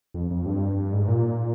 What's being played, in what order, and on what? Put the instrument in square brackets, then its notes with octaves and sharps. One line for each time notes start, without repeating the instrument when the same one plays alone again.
[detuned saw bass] F2
F2
G2
G#2
A#2